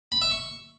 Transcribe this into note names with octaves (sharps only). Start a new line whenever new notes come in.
B5
E5
C#6